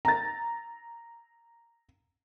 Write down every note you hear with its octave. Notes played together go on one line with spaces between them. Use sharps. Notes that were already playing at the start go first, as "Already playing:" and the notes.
A#5 A6